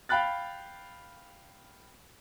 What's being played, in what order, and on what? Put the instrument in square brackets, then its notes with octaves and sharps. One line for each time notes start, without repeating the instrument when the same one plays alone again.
[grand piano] F5 G5 B5 F#6 A6